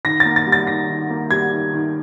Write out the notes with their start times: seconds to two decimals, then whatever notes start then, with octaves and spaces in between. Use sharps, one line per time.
0.05 D#3 A#6
0.20 A#3 A6
0.36 A6
0.46 G3
0.52 A6
0.67 D#3 A#6
0.88 D#3
1.10 A#3
1.31 G3 G#6
1.52 D#3
1.74 D#3